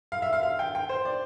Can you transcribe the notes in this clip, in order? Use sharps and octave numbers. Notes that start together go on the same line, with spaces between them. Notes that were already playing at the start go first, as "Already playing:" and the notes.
F5
E5
F5
F5
G5
G5
C5
D5